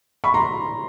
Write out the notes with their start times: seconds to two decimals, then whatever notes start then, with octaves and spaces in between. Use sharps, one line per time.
0.24 B5 C#6
0.34 A#5 C6